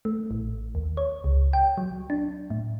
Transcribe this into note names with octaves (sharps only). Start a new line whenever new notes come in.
A3
A1
D#2
C#5
C#2
G5
F#3
D4
A2